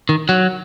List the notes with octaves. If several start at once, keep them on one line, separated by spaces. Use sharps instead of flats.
D#3
F#3